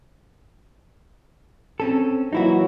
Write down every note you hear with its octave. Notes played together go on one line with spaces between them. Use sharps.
C4 C#4 A4
A#2 E3 F#3 D#4 E4 F#4